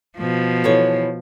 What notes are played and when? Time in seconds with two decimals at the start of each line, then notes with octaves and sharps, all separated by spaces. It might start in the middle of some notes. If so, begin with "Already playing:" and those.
0.18 B2 F3
0.64 E3 A4 C#5